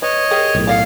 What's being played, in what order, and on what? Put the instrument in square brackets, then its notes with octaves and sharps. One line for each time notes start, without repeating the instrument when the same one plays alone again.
[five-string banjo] B4 [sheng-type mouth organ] C#5 D#5
[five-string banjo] G4 G#4 A#4
[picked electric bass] B1 A2
[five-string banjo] A4 D#5 F#5 [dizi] F5